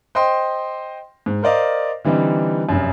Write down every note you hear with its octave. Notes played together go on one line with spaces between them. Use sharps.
C5 D#5 G5 C6
G#2
A#4 C5 D5 D#5 F5
D3 E3 G3 C4 D#4
F1 F#2